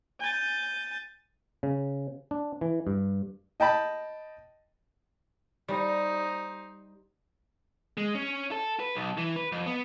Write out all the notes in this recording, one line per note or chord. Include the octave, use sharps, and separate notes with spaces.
G#5 G6 A6
C#3
D4
E3
G2
D#5 G5 A5 B5
G3 D#4 C5
G#3
C#4
A4
B4
B1
E3
B4
F2
B3